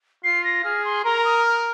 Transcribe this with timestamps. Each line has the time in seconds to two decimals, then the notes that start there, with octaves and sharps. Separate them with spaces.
0.24 F4 C7
0.44 A#6
0.64 G#4 F6
0.85 C6
1.05 A#4 A#5
1.25 D#6
1.46 F6